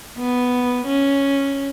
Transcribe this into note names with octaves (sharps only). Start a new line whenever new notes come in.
B3
C#4